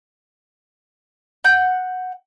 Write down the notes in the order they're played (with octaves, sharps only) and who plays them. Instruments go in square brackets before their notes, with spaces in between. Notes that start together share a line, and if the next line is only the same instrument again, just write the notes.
[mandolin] F#5 G6